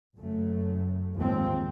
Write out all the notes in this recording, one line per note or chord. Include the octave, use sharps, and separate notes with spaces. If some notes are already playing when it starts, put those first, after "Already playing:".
F#1 F#2 F#3 A3
D#2 G#2 F3 G#3 C4